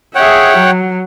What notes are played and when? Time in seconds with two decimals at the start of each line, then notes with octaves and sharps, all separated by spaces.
0.15 G#4 C#5 E5 F#5 G5
0.57 F#3